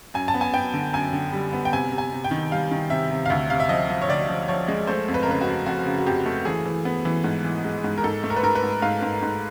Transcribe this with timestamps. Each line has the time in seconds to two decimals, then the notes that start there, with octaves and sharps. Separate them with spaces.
0.14 F#2 G#5
0.28 A5
0.34 B3
0.41 G#5
0.54 B3 G5
0.74 D3
0.93 F#2 G#5
1.13 D3
1.33 G3
1.53 B3
1.65 G5
1.73 C3 G#5
1.92 C3
1.98 G#5
2.12 C3
2.24 G5
2.31 D#3
2.51 G3 F5
2.71 D#3
2.90 C3 E5
3.11 C3
3.26 F5
3.30 D2 E5
3.50 C3 F5
3.60 E5
3.69 F3 D#5
3.89 F3
4.02 C#5
4.09 D2 D5
4.29 F3
4.48 F3 C#5
4.68 G#3
4.87 A3 C5
5.08 F2
5.14 B4
5.23 A#4
5.27 C#3 B4
5.41 F#4
5.47 F2
5.66 F2 F#4
5.86 C#3
5.98 F#4
6.06 F2 G4
6.26 A3
6.45 E3 G#4
6.66 E3
6.85 B3
7.05 E3
7.24 G#2
7.44 E3
7.64 G#3
7.84 G#2
7.98 A#4
8.04 G#2 A4
8.24 A3
8.30 A#4
8.36 B4
8.43 G#2 A#4
8.55 B4
8.63 G#2
8.82 G#2 F5
9.02 G#2
9.22 G#2